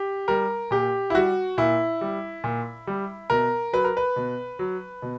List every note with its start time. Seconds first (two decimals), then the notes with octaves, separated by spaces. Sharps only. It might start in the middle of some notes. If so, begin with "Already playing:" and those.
Already playing: G4
0.28 G3 A#4
0.71 A#2 G4
1.10 E4
1.15 G3 F#4
1.58 A#2 E4
2.01 G3
2.44 A#2
2.87 G3
3.30 B2 A#4
3.73 F#3 B4
3.84 A#4
3.97 B4
4.16 B2
4.59 F#3
5.02 B2